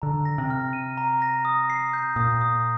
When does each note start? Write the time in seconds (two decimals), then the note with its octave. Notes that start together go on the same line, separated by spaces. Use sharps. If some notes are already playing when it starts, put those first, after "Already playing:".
0.02 D3 A#5
0.25 A#6
0.38 C3
0.50 F6
0.73 D#7
0.98 A#5
1.22 A#6
1.45 D#6
1.70 C7
1.93 G6
2.16 A#2 D#6
2.41 D#6